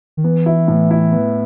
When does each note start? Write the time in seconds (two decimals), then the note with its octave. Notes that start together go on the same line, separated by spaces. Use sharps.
0.17 D#3
0.24 E3 B3
0.46 E4
0.68 A2
0.91 E4
1.12 B3